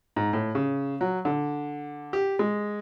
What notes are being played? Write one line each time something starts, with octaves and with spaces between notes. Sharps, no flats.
G#2
A2
C#3
F#3
D3
G4
G#3